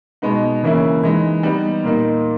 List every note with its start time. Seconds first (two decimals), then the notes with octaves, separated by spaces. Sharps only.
0.22 B2 G#3 B3 D#4
0.63 C#3 E3 A#3 C#4 E4
1.04 E3 G#3 D#4
1.43 G3 B3 D#4
1.84 A#2 A#3 D#4